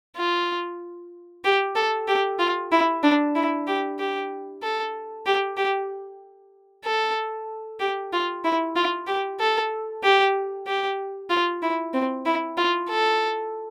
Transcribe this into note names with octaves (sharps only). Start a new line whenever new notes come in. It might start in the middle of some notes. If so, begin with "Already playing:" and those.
F4
G4
A4
G4
F4
E4
D4
E4
G4
G4
A4
G4
G4
A4
G4
F4
E4
F4
G4
A4
G4
G4
F4
E4
C4
E4
F4
A4